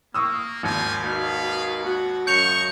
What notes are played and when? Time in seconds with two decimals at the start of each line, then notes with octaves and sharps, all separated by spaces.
0.14 A#3 C#6 D#6 E6
0.63 G#1 D#2 G4 F5 G#5
1.03 A#3 D#4 F#4 G#4 B4 F5
1.85 F#4
2.27 F#2 C#3 C#4 D#5 C#6 G6 C#7 F7